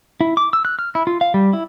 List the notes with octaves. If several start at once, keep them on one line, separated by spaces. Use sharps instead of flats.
E4
D6
E6
F#6
F6
E4
F4
F5
G3
E4